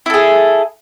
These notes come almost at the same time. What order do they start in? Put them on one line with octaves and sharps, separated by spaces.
E4 A4 G#4